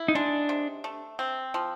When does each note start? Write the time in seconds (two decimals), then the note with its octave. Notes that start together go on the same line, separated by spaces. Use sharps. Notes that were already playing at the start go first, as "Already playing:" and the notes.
Already playing: E4
0.08 D#4
0.15 G#3 D4
0.49 C3
0.84 A3
1.19 C4
1.54 F3